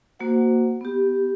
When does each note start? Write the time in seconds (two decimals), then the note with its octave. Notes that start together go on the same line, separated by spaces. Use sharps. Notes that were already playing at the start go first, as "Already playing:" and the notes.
0.19 A#3 F#4 C5 F#5
0.81 B3 G4